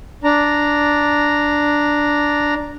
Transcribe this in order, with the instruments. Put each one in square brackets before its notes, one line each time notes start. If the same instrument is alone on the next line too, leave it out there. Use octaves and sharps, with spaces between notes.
[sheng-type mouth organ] D4 A#5